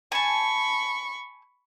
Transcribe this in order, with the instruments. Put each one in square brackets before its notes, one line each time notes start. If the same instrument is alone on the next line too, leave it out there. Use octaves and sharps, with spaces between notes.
[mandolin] G#5 A5 [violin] B5 C#6